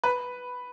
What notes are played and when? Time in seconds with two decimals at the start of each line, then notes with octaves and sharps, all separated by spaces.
0.04 B4